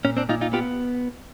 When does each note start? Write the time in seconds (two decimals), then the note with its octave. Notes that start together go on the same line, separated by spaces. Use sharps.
0.05 A#2 C#4
0.17 C4 D4
0.29 A#2 D#4 F4
0.41 D#4 F4
0.53 B3 F4 G4